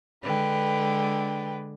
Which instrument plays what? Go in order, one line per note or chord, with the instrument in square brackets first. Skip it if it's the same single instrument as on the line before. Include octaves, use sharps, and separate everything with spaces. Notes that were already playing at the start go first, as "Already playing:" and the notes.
[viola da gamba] D3 G#3 [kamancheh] B4 G5